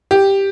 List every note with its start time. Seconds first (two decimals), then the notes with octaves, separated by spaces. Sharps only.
0.11 G4